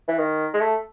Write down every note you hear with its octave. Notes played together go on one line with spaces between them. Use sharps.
E3
D#3
G#3
A3